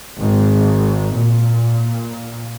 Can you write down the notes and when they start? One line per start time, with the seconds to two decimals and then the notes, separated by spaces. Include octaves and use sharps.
0.20 G#1
1.16 A#2